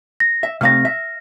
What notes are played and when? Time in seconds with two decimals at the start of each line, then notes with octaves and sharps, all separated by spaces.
0.20 A#6
0.43 E5
0.61 C3 A3 F5 F6 A#6
0.85 E5